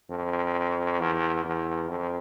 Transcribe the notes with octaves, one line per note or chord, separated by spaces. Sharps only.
F2
E2
E2
F2